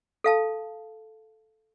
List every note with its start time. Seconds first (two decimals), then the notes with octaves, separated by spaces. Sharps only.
0.24 A4 F5 A5